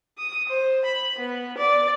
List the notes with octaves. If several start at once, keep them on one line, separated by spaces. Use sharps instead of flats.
D#6
C5
B5
B3
D5